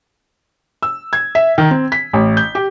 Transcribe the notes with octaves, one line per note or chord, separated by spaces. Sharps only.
E6
G#6
E5
D#3
C4
B6
A1
G6
G4